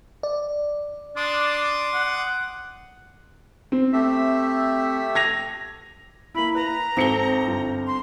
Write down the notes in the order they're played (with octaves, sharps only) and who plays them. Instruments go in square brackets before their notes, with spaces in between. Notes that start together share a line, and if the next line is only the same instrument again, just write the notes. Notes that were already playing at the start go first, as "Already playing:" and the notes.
[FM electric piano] D5
[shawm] D4 [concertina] C6 D6 D#6
[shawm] F#5
[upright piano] C4
[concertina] A3 G4 E5
[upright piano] G#6 A#6 F7
[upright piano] A#3 E4 [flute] B5
[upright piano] B4 [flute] A#5
[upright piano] G#1 C#7 G7 [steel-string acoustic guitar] C4 A4
[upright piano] G1
[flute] C6